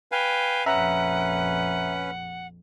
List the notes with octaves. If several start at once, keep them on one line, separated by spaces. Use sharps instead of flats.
B4 F5 G5 G#5
A#1 F2 C#4 B4 E5 F#5 A#5